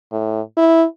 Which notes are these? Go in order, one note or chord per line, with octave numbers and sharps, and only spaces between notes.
A2
E4